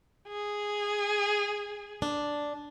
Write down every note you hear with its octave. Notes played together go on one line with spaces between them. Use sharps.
G#4
D4